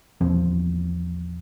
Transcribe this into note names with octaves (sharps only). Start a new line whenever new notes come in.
A#1 E2 F3 C4